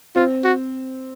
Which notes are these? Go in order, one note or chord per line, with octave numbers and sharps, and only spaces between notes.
C4 F4
F#4